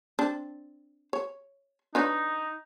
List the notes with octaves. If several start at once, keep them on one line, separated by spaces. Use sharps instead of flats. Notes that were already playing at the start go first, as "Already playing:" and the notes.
C4 D4
C#5
D4 D#4 B4 C#5